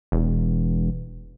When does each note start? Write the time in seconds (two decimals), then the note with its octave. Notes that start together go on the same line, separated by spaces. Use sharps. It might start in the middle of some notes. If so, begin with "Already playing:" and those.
0.12 E1